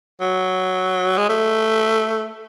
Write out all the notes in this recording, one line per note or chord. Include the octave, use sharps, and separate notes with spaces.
F#3
G#3
A3